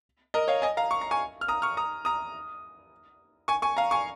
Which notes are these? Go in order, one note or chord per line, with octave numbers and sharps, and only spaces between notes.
A#4 D#5
C#5 F5
D#5 G#5
F5 A#5
C#6
A#5
G#5 C#6
F6
A#5 D#6
C#6 F6
A#5 D#6
A#5 D#6
G#5 C#6
G#5 C#6
F5 A#5
G#5 C#6